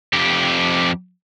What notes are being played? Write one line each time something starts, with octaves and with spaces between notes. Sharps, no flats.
F2 G4